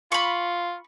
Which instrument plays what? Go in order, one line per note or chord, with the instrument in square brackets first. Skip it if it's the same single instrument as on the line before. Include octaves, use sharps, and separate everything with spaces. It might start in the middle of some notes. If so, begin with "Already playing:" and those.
[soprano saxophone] F4 [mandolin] B5 C#6